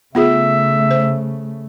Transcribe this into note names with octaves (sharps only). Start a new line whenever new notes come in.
C#3 A3 B3 F4 G#4 E5
C5